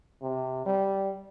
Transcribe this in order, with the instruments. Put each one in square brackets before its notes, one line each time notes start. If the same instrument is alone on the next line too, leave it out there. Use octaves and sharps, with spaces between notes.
[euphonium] C3
G3